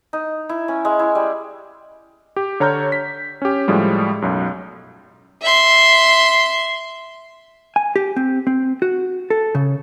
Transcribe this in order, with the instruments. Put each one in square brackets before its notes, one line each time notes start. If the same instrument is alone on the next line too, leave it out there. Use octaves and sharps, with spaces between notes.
[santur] D#4
E4
C#4
G#3
E4
G3
[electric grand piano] G4
D3 C#5 A#5 F6 G6
B6
C#4 G4
A2 F3 G3 G#3
B1 F#2
[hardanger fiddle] E5 C6
[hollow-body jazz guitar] G#5
G4
C4
C4
F#4
A4
C#3